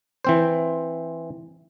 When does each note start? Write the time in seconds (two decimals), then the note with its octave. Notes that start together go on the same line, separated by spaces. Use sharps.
0.25 E3 C4 C5